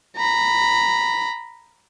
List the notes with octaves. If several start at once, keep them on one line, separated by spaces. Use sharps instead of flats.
A#5 B5